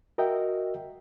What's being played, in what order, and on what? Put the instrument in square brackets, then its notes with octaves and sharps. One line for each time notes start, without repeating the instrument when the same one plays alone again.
[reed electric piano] F#4 A#4 D#5 E5 G5